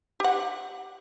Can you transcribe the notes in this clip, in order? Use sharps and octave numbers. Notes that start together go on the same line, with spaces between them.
G4 F#5